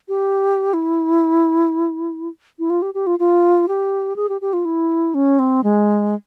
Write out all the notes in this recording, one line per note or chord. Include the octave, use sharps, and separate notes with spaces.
G4
E4
E4
F4
G4
G4
F4
F4
G4
G#4
G4
G4
F4
E4
C#4
C4
G#3